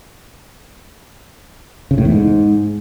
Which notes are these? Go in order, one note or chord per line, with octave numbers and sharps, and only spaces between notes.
C#3
A2
E2
G#2